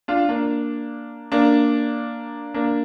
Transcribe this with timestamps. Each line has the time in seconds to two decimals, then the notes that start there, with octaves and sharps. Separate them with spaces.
0.08 D4 F4
0.29 A#3 D4
1.32 A#3 D4
2.54 A#3 D4